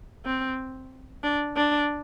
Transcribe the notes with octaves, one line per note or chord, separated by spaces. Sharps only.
C4
D4
D4